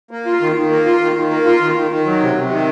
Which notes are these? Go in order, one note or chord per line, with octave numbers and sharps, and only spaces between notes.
A#3
F4
D#3
D#3
A#3
F4
D#3
D#3
A#3
F4
D#3
D#3
D#3
F#3
C3
C3
D#3